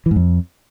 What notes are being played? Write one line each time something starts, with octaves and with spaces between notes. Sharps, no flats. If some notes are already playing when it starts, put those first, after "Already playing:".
E3
G#2
F2